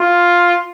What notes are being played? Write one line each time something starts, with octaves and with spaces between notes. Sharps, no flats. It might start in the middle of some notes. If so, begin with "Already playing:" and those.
Already playing: F4